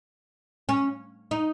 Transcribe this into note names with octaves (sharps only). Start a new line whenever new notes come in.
C#4
D#4